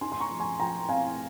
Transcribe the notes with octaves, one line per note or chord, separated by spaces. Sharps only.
D#4 G#5 C6
C6
A#5 C#6
F3
G#5 C6
F3 G5 A#5
C4 F5 G#5